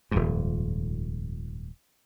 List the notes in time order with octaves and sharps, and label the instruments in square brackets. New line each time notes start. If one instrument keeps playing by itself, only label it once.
[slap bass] D#1 F2 G#2